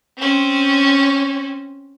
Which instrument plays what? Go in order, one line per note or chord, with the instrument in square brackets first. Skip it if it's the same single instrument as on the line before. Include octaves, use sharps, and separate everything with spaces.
[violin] C4 C#4